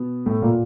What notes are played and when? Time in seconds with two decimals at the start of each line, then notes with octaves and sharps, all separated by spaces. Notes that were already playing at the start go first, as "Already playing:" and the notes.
Already playing: B2 B3
0.26 A2 A3
0.42 A#2 A#3